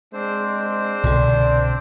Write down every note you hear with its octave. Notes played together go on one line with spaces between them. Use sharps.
G#3 C4 D4 C5
C2 B2 D3 D5